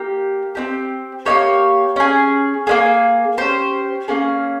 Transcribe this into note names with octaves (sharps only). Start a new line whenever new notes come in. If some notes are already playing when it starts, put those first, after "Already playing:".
Already playing: A#3 G4
C4 D#4 G4
A#3 D#4 G4 C#5
C#4 G#4
A#3 C#4 G#4
C#4 G4 C5
A#3 C#4 G#4